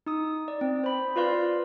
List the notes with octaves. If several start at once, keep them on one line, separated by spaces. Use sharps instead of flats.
D#4 D#6
D5
C4
C5 B5
F4 B4 D5 F5 C6